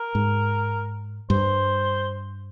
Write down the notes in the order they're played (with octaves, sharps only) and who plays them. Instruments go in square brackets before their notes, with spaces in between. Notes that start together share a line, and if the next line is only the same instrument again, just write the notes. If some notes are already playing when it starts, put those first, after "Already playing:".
Already playing: [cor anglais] A#4
[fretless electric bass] G#2
[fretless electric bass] G2 [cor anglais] C5